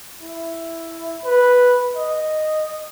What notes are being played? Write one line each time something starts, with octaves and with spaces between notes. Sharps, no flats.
E4
B4
D#5